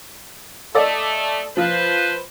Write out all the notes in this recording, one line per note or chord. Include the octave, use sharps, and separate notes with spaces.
A3 A4 D5 D#5
F3 F4 B4 C5